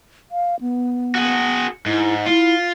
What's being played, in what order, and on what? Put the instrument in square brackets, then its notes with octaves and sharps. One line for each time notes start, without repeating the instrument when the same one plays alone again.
[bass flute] F5
B3
[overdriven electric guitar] F#4 G#4
[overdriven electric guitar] G#2 [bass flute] E4
[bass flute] E4 [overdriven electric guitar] F4